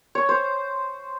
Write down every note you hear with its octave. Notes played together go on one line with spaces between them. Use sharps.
C#5
C5